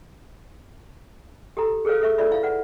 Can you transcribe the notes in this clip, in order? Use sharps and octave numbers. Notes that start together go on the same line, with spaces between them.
G4 A4 A#5
G#4 A4 B4 C#5 F5
A4 E5 C#6
F4 A4 D5 E5 B5
E4 F5
B4 F#5